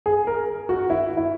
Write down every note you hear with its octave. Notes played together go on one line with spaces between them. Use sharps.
G#4
A#4
F#4
E4
E4